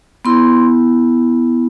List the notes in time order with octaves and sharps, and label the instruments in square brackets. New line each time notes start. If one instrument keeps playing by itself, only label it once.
[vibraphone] B3 E4 C6